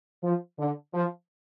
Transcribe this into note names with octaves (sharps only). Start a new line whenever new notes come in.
F3
D3
F3